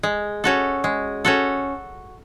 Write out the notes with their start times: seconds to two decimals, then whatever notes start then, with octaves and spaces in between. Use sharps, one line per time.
0.03 G#3
0.44 C#4 F#4 A4
0.84 G#3
1.25 C#4 F#4 A4